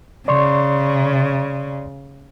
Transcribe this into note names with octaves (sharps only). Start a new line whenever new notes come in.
C#3 D5 C6 C#6